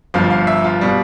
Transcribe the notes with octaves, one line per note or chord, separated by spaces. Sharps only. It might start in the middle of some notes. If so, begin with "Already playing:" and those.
G1 G2 F3 F5
F5
E5
F4
B2 G3